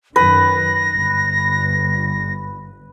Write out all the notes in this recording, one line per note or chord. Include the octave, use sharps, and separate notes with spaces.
F#2 D#3 B4 A#6
G1